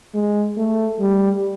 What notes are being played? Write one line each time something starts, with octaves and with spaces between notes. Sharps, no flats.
G#3
A3
G3